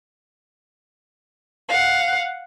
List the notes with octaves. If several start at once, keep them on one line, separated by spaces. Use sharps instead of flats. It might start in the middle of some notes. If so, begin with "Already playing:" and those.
F5 F#5